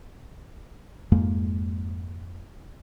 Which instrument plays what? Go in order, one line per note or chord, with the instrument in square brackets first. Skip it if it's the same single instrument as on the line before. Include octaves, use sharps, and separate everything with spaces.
[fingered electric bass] F2 G#2 G#3 A#3